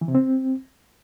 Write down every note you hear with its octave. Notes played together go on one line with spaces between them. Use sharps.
E3
C3
C4